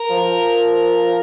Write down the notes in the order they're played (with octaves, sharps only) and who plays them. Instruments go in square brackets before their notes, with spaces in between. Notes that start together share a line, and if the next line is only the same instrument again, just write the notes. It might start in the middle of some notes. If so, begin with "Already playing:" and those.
Already playing: [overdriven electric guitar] A#4
[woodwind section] F3